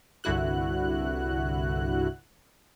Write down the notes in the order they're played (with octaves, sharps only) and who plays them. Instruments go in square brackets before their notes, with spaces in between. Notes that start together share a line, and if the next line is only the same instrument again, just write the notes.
[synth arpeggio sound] C2 G2 D3 E4 F#4 F#6